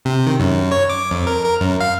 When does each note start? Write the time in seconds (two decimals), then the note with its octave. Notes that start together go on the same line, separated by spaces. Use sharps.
0.05 C3
0.27 D#3
0.40 F#2
0.72 C#5
0.90 D6
1.11 F2
1.27 A#4
1.44 A#4
1.61 F#2
1.80 F5